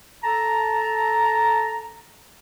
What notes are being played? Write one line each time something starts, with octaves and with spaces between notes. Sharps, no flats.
A4 A5 A#5